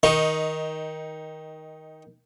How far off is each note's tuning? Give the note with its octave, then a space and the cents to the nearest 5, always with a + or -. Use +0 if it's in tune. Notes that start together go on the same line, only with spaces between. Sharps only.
D#3 +15 D#4 +0